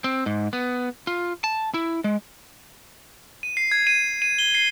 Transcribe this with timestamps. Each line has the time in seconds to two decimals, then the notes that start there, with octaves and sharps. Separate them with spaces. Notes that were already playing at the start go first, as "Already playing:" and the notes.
0.04 C4
0.26 G#2
0.53 B3
1.07 F4
1.44 A5
1.74 E4
2.04 G#3
3.43 D#7
3.57 C7
3.72 G#6
3.87 D#7
4.22 D#7
4.39 G7
4.55 C7